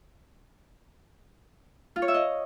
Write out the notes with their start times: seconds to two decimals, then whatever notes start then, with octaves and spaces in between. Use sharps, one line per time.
1.96 F4
2.02 C#5
2.08 E5
2.14 D#5